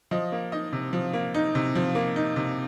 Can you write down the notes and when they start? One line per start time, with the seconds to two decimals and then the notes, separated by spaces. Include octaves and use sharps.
0.11 F3 D#5
0.32 A#3
0.52 D#4 D#5
0.73 C3
0.93 F3
1.13 A#3
1.34 D#4
1.55 C3
1.75 F3
1.95 A#3
2.16 D#4
2.36 C3